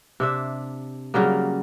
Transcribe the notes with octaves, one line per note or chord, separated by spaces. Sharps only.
C3 D4 E5
C#3 F#3 G3 A#3